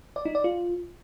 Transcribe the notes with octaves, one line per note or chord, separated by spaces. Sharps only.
D5
D#4
D5
F4